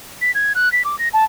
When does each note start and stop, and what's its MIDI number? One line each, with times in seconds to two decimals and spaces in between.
0.21 0.31 95
0.35 0.53 92
0.55 0.71 90
0.72 0.82 95
0.85 0.98 86
0.99 1.09 94
1.13 1.24 81